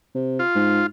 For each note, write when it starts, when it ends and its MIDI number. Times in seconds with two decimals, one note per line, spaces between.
0.15 0.40 48
0.39 0.86 65
0.55 0.83 44